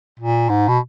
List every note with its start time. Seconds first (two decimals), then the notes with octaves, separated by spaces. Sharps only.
0.19 A#2
0.49 G#2
0.68 B2